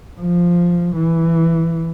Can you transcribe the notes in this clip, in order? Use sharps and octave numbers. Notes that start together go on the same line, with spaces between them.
F3
E3